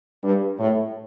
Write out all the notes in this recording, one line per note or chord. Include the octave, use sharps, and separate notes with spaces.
G2
A2